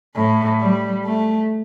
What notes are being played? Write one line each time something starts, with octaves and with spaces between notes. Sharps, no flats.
A2
G3
A3